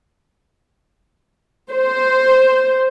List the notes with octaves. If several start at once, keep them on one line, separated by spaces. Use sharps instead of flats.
C5